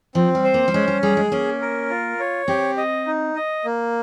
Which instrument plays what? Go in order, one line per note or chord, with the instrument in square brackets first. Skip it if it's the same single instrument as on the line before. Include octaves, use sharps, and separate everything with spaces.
[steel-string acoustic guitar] F3 [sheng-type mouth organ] C4
[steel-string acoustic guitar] G3
[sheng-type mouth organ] C5
[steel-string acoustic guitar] A#3
G3
[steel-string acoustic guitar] G#3 [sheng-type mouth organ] C#4
[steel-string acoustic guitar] G3
[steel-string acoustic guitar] G3 [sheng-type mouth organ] G#4
[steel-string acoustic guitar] G#3
[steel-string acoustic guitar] A#3 [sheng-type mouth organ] C#4
[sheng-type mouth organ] A#4
F4
C#5
[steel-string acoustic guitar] C4 [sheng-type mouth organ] G4
[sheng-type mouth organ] D#5
D#4
D#5
A#3